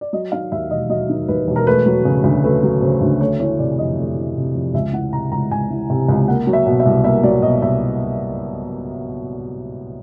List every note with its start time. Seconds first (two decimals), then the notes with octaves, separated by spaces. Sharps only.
0.01 D5
0.13 F#3 D#5
0.32 D#3 F5
0.52 D#2 E5
0.71 E1 D#5
0.89 F#3 D#5
1.09 D#3
1.28 D#2 B4
1.48 E1
1.56 A#4
1.67 A3 B4
1.86 F#3
2.05 C#3
2.24 D2
2.44 A3 B4
2.63 F#3
2.82 C#3 C5
3.01 D2
3.20 A3 C#5
3.40 E3 C#5
3.59 C3 D5
3.78 F2 D#5
3.98 A3
4.16 E3
4.36 C3
4.54 F2
4.74 C#2 E5
4.93 E3 F#5
5.13 C3 A#5
5.32 C#2 A#5
5.51 C#2 G#5
5.70 E3
5.90 C3
6.08 C#2
6.28 A#3 F#5
6.47 F#3
6.53 E5
6.66 B2
6.80 E5
6.85 C2
7.04 A#3 E5
7.23 F#3 D5
7.42 B2 D#5
7.62 C2 E5